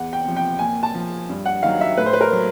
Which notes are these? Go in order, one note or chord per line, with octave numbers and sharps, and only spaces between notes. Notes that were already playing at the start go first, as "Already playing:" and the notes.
Already playing: E2 F#5
G5
C3 F3
G5
A#2 G#5
A5
F3
G2
F#5
D#3 F#3 F5
E5
A2 B4
C5
B4
A#4
F#3